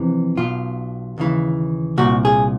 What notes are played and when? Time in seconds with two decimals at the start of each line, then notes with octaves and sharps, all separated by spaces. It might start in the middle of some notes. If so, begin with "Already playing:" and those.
Already playing: F2 C3 E3
0.37 B1 B2 F4
1.18 D#2 C#3 E3
1.98 C2 A#2 F#4
2.25 G#4